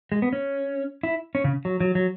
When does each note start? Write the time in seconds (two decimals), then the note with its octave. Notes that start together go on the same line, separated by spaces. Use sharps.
0.12 G#3
0.22 B3
0.33 C#4
1.03 E4
1.35 C#4
1.44 C#3
1.65 F#3
1.80 F#3
1.95 F#3